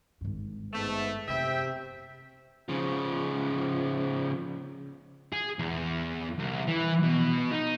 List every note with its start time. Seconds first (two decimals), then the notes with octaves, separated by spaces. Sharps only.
0.21 G#1 G2
0.73 G#2 A3 B3
1.28 F1 F#2 C3 E5 G5
2.69 C#3 F3
5.33 G#4
5.59 E2
6.39 C2
6.68 E3
7.03 B2
7.51 D#4